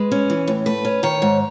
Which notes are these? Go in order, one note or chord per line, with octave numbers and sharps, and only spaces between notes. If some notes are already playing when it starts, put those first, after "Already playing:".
Already playing: G#3 B4
C#4
E3
A2
A3 B4
C#4
D#3 C#5
G#2